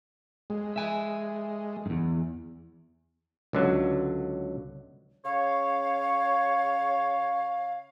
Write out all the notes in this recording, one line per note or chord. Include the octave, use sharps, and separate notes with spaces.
G#3
E5 G#5
E2 G2
C#2 D3 F#3
C#3 C#5 F5